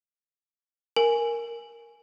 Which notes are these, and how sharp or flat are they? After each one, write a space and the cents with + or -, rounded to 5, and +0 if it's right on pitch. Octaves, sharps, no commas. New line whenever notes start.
A#4 +0 G#5 +0